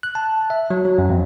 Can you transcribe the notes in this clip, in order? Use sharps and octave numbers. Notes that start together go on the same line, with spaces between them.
F#6
A5
E5
F#3
F#3
F#2
F2